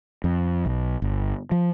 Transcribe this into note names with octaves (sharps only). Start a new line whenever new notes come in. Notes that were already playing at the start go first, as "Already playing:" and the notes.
F2
B1
G1
F3